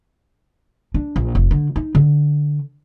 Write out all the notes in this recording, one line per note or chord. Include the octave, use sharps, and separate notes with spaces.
D4
A#1
F1
D3
D#4
D3